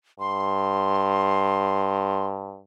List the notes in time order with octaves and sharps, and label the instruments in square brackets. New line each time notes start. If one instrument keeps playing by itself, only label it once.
[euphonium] G2 [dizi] C6